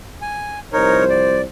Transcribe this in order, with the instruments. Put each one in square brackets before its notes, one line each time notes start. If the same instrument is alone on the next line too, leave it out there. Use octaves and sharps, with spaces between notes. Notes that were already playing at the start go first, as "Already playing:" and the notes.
[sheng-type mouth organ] G#5
[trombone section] C2 F3 C5 [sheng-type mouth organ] D#4 A#4 C#5
[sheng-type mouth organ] D5